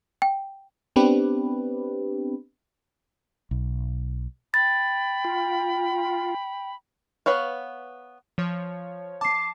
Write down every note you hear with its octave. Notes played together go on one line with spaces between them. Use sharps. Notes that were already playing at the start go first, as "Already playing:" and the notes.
G5
B3 C4 D4 G4 B4
B1
G5 B5 A6
F4
B3 B4 C#5 F5
F3 C#5
A5 D6 C7